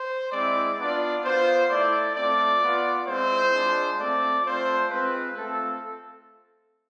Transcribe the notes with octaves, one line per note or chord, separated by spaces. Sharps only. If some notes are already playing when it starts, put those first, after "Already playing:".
Already playing: C5
G#3 C4 E4 D5
B3 D4 F4 D5
B3 F4 C5
A3 E4 D5
A3 C4 F4 D5
B3 F4
G#3 C4 E4 C5
G#3 D4 F4
A3 C4 F4 D5
A3 C4 F4 C5
G#3 C4 F4 B4
A3 C4 F4 A4